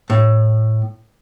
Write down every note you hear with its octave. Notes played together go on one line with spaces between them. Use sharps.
A2